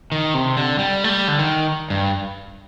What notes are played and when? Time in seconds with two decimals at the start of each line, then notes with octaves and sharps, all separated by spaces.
0.12 D#3
0.34 C3
0.57 D3
0.79 G3
1.04 A3
1.09 G3
1.28 D3
1.39 D#3
1.90 G2